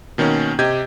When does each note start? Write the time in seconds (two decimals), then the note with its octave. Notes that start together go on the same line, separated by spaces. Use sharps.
0.18 B2 D#3 A#3 C#4
0.59 C3 G4 D#5 G6 G#6